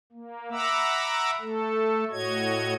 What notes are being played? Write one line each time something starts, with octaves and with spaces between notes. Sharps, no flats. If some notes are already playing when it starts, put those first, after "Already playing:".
A#3
E5 F#5 A#5 B5 D6 E6
A3 A4
A2 F#4 C#5 D#5 G#6